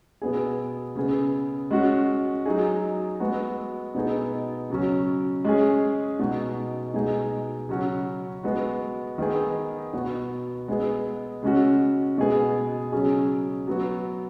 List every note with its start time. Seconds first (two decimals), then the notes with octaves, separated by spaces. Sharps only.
0.22 B2 B3 G#4
0.96 C#3 B3 G#4
1.71 G#3 C#4 F#4
2.46 F#3 D#4 G#4
3.20 G#3 B3 F#4
3.95 B2 B3 D#4 G#4
4.70 C#3 F#3 C#4
5.44 G#3 C#4 G#4
6.19 B2 G#3 D#4 F#4
6.94 B2 G#3 D#4 G#4
7.69 C#3 F#3 C#4 F#4
8.43 G#3 B3 F#4
9.18 D#3 B3 D#4 G#4
9.93 B2 B3 F#4
10.68 G#3 B3 G#4
11.43 C#3 G#3 C#4 F#4
12.18 B2 G#3 B3 G#4
12.92 C#3 F#3 C#4 G#4
13.67 F#3 B3 F#4